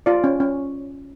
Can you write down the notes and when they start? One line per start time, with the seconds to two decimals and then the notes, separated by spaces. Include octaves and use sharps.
0.06 F4 D5
0.24 C#4
0.40 C#4